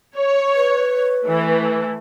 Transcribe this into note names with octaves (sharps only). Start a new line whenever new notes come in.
C#5
B4
E3 A3